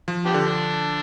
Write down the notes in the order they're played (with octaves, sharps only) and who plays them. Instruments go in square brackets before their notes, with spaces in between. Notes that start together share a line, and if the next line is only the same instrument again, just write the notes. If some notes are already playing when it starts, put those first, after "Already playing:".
[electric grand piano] F3
[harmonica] B3 D4 G4
[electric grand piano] D3
[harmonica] D4